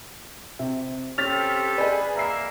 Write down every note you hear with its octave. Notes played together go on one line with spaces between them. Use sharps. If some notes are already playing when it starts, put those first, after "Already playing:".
C3 E5
C4 C#4 G4 A4 F6 A6 B6 F7
G#4 B4 D5 D#5
A#3 E5 A#5 E6 C7